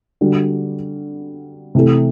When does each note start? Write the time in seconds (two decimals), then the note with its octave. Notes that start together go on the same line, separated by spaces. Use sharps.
0.21 D3 G3 D4 F#4
1.75 C3 E3 A3